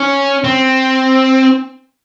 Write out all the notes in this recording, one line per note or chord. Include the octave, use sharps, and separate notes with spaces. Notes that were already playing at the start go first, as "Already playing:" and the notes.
Already playing: C#4
C4